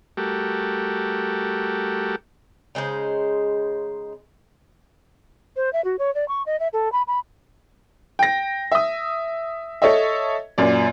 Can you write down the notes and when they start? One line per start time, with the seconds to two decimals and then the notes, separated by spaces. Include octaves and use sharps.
0.17 G3 A3 F#4 G4 A4 A#4
2.75 C#3 G#3 D#4 C5
5.56 C5
5.73 E5
5.85 F#4
5.99 C#5
6.15 D5
6.28 C#6
6.46 D#5
6.60 E5
6.73 A4
6.92 B5
7.07 B5
8.19 G5 A#6
8.72 E5 D#6
9.82 A4 C#5 D#5 E5
10.58 F#2 A#2 D5